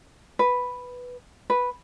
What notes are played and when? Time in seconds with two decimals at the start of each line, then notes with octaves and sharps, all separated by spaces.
0.39 B4
1.50 B4